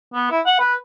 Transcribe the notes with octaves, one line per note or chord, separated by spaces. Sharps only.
B3
E4
F#5
B4